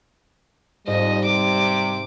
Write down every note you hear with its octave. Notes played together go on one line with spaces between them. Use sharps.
F2 G#2 G3 D#5
C3 D6